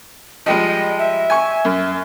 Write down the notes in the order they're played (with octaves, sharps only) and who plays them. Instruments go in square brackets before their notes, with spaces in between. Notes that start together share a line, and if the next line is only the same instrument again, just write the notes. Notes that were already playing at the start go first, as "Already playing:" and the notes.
[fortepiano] F3 G3 G#3 [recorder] D#5
[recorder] E5
[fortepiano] G#5 C#6
F#2